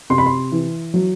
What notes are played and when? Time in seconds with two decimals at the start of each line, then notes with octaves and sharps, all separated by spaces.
0.10 C3 C6
0.18 B5
0.26 C6
0.52 E3
0.94 F#3